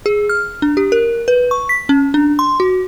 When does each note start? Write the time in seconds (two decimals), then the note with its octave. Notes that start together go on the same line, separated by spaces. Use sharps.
0.06 G#4
0.29 F6
0.62 D4
0.77 G4
0.92 A#4
1.28 B4
1.51 C#6
1.69 B6
1.89 C#4
2.14 D4
2.39 C6
2.60 F#4